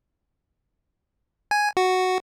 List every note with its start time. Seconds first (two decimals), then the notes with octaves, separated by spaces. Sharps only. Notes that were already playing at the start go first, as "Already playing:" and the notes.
1.51 G#5
1.77 F#4